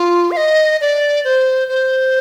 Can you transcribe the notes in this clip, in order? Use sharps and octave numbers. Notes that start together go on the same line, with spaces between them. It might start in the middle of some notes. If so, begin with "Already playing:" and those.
Already playing: F4
F5
D#5
D5
C5
C5